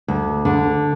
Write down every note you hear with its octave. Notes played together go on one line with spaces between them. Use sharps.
D2
D3